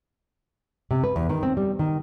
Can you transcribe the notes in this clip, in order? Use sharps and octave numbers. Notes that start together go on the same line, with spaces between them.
C3
B4
E2
D#3
C4
G3
D#3